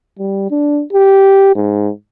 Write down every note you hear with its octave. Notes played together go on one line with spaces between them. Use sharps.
G3
D4
G4
G#2